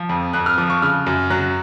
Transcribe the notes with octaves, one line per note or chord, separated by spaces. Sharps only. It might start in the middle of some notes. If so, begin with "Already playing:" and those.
Already playing: F3
F2
F2 F#6
F6
F3 D6
C#6
C#3 F6
F#2
F#3 F#6